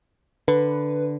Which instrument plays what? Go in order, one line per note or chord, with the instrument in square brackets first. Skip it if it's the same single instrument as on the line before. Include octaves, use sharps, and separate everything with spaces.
[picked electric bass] D3 [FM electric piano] B4